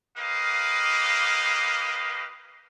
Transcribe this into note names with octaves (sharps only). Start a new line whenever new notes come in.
A#3 G4 B4 D#5 F5